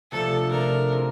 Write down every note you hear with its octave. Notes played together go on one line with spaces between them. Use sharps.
C3 F3 A3 D4 A4
C3 F3 A3 D4 A#4
C4 F4 G#4